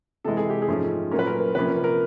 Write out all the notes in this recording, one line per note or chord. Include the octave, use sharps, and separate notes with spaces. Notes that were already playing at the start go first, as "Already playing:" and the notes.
C3 E3 G#3 A4
G#4
G4
G#4
G#2 F3 A3 C#4
A#2 F#3 A3 C#4 A#4
B4
A#4
C3 F3 A#3 C#4 B4
A#4